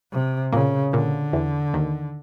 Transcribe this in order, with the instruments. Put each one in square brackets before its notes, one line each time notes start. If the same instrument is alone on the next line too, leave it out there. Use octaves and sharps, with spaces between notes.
[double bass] C3
[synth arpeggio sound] A#2 A#3 [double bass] C#3
[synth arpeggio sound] A#2 A#3 [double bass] D3
[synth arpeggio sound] E2 E3
D#2 D#3